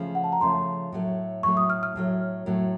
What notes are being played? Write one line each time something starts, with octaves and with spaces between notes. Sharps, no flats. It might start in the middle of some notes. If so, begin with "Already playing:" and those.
Already playing: C#3 F3 A3
F#5
A5
A#5
C#3 F3 A3 C6
A2 F#3 A3
A2 F#3 A3 C#6
D#6
F6
F6
A2 F#3 A3
A2 F#3 A3